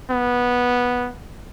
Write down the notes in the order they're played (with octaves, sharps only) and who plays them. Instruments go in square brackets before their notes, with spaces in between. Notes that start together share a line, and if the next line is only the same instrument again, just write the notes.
[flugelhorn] B3